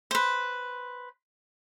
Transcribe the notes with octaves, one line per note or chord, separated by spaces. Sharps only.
B4 C5